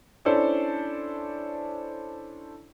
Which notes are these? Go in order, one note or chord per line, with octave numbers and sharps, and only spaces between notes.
C#4 D4 E4 A4 C5 D5